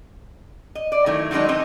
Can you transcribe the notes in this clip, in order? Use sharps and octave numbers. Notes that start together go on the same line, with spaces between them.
D#5
D5
D#3 F#3 A3 E4
D#3 F#3 G#3 D4 D#4
E3 C4 D#4 D#5